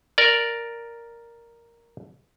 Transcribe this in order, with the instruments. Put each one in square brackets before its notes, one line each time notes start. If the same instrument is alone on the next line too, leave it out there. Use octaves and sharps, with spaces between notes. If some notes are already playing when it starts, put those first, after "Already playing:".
[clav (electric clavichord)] A#4 D5